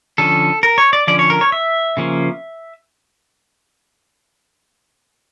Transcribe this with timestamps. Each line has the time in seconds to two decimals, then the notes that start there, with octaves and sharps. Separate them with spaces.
0.18 D3 F3 C#4 A4
0.63 A#4
0.78 C#5
0.93 D5
1.07 D3 F3 C#4 D5
1.19 C#5
1.30 A#4
1.41 C#5
1.52 E5
1.97 C#3 F3 A#3 C#4